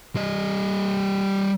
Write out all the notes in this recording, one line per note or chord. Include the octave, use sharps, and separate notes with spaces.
G3 D#5